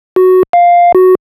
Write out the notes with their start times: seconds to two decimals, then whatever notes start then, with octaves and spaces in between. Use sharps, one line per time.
0.16 F#4
0.53 F5
0.95 F#4